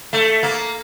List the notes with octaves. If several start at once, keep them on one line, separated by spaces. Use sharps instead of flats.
A3
A#3